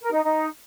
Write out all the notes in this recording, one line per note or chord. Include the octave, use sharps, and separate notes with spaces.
A#4
D#4
D#4